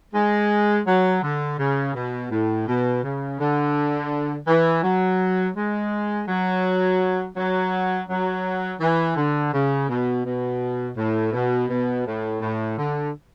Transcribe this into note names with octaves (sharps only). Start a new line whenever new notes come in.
G#3
F#3
D3
C#3
B2
A2
B2
C#3
D3
E3
F#3
G#3
F#3
F#3
F#3
E3
D3
C#3
B2
B2
A2
B2
B2
A2
A2
D3